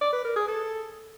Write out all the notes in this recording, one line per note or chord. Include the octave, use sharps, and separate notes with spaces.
D5
B4
A#4
G#4
A4